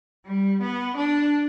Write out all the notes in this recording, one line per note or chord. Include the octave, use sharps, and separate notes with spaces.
G3
B3
D4